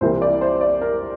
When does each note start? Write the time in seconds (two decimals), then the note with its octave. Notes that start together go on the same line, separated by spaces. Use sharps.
0.01 C2 C3 E3 A#3 C5
0.22 D5
0.41 C5
0.61 D5
0.81 A#4